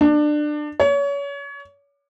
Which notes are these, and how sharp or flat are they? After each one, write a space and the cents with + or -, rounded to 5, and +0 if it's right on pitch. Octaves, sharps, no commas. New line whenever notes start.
D4 +25
C#5 +30